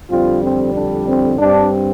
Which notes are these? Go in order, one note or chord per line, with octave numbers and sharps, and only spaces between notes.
F2 D3 G3 C4 F4
C4
D4
C4
G2 G3 C4 D4